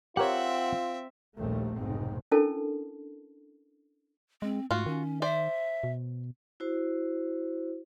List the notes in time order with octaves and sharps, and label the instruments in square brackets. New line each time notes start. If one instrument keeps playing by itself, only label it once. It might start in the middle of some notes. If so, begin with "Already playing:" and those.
[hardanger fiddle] C4 E5 [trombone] F4 [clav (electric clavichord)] G4 A#4 C#5 [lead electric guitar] F#5
[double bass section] A#1 D#2 G3 A3 C4
F1 B1 G#2 B2 C4
[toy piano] C#4 D4 E4 A4 A#4 A5
[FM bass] G#3 [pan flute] C4
[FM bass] G#2 [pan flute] A3 [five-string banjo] F4 F#4
[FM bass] D#3 [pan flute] C#4
[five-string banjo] C5 D5 [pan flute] E5
[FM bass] B2
[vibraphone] E4 F#4 C5